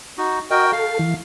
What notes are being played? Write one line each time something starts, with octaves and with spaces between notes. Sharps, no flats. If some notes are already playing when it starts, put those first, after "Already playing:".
D#4 F#4
F#4 A#4 D#5 G5
A4 F5
E3